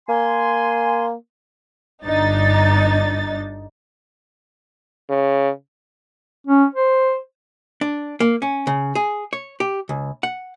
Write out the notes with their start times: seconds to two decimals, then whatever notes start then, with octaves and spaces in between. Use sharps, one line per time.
0.09 A#3 G#5 C6
2.05 G1 G2 D4 D#4 A6
5.10 C#3
6.47 C#4
6.74 C5
7.81 D4
8.20 A#3
8.42 C#4
8.67 C#3
8.95 G#4
9.33 C#5
9.60 G4
9.89 C#2
10.23 F#5